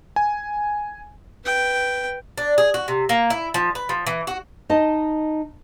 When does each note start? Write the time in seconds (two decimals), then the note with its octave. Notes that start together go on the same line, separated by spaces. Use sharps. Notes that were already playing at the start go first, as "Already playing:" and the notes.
0.16 G#5
1.44 B4 G5
2.38 D4
2.58 G#4
2.74 F#4
2.88 C3
3.09 A#3
3.30 E4
3.54 F3
3.75 B4
3.89 F3
4.07 E3
4.27 F#4
4.70 D#4 D#5 A5